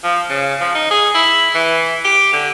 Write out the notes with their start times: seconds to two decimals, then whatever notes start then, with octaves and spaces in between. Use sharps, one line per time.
0.04 F3
0.30 C#3
0.60 F3
0.75 D#4
0.91 G#4
1.15 E4
1.55 E3
2.05 G4
2.33 D3